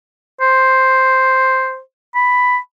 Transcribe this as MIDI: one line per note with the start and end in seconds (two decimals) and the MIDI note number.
0.41 1.79 72
2.15 2.57 83